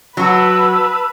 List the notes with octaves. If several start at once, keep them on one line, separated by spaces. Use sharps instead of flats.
F#3 F#4 B4 A5 E6